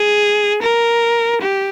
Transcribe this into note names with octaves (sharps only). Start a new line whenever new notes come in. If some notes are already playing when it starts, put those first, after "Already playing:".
Already playing: G#4
A#4
G4